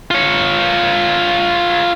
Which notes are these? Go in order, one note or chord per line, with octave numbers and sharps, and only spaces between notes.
F4 C#5